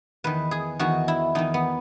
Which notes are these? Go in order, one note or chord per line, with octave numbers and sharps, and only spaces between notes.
E2 D#3 B4
G#4
E2 D#3 F#4
E4
E2 D#3 D#4
B3